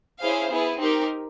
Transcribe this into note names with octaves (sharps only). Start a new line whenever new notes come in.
C#4 E4 G#4 C5 F5
B3 E4 G#4
C4 D#4 G4 A#4